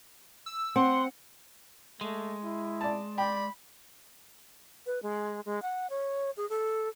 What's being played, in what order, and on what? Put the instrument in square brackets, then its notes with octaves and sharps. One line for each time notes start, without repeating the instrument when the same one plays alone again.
[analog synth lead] E6
[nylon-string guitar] C4 [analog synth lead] F#5 [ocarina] C6
[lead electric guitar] G#3 [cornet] A3
[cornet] E4
[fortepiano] D5 A5
[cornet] D5 [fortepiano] G5 [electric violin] B5
[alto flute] B4
G#3
G#3
F#5
C#5
G#4
A4